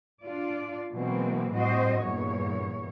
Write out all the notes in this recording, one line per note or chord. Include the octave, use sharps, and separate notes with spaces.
D4 F4 D5
B2 E3 F#3 G#3 A#3 C4
A2 G3 C4 F#4 C5 D#5
E2 G2 A#2 C#5